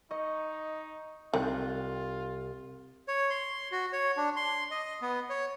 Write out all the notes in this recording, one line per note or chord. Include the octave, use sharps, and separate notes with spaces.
D#4 D#5 C#6
C2 D#3 C4 F4 F#6
C#5
C6
F#4
C#5
D4
C6
D#5
B3
C#5